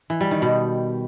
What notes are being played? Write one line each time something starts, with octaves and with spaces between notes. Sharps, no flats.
E3
G3
D#3
B2